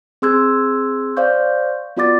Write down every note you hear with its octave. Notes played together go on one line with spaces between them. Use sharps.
C4 G#4 C6 E6 F#6 G#6
C5 D5 F5 C#6 G6
B3 F4 F#4 D5 D6 A6